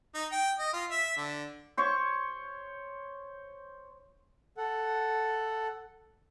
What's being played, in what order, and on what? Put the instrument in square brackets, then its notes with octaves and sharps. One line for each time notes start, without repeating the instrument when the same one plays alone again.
[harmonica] D#4
G5
D#5
F4
E5
D3
[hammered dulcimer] C5 C#5 C#6
[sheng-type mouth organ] A4 F#5